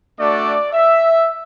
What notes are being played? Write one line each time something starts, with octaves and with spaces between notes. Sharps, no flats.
A3 D4 F#4 D5
E5